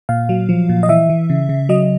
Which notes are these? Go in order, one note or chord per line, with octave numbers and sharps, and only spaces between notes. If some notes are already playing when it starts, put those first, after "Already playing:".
A#2 F5
F#3
F3
A#2
D#5
E3 E5
E3
C#3
C#3
F#3 D#5